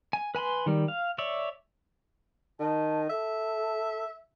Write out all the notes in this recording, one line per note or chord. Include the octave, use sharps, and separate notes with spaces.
G#5
B4 G#5 B5 C6
D#3 G3
F5
C#5 D5 E5
D#3 A5
A4 E5